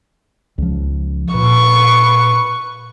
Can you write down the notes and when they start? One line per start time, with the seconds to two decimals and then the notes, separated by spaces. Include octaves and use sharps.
0.58 C#2 F3
1.35 A#2 B4 C#6